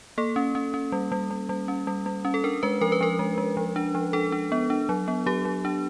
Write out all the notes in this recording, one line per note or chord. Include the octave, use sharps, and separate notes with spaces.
A#3 A4
C#4
C#4
C#4
G3
G3
G3
G3
C#4
G3
G3
C#4
A4
D4 A#4
G#3 B4
F3 A#4
B4
F3 A#4
G#3
G#3
F3
D4
F3
D4 A4
D4
B3
D4
F#3
B3
F#3 G4
F#3
D4